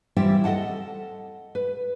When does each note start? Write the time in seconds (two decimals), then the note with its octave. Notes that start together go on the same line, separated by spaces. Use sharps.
0.17 E3 G3 C4 E4 F4 G4
0.44 A4 D#5 F#5 A5
1.55 B4